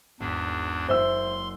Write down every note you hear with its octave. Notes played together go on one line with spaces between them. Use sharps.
G#1 E2 D4 B6
F#1 C5 E5 C6 E6